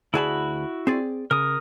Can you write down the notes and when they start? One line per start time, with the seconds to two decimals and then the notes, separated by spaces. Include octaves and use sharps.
0.14 D2 E4 F#4 G#4 A5 B5
0.87 C4 G#4 D5
1.31 C#3 A#4 D#6